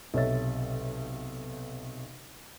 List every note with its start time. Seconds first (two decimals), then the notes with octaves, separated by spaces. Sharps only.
0.14 B1 C3 A4 C#5 E5 A6